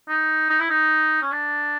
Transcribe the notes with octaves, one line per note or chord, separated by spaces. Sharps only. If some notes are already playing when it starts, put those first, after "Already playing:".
D#4
D#4
E4
D#4
C#4
D4